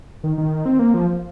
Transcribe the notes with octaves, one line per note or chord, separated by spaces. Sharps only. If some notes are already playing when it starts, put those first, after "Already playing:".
D#3
D#3
C4
A#3
F3